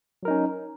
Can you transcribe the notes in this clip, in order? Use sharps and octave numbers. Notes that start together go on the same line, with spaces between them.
F#3 C#4 D#4 A#4